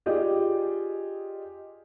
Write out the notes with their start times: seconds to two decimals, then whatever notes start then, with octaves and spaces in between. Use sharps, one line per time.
0.06 F4 G4 G#4 D5 D#5